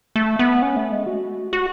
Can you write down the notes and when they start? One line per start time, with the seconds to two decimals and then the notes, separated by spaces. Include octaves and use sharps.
0.16 A3
0.39 B3
0.62 C#4
0.76 A3
0.92 G#3
1.07 F#4
1.53 F#4